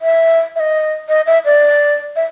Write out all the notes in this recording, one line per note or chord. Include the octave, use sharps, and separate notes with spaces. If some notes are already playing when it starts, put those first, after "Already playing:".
E5
E5
D#5
D#5
E5
D5
E5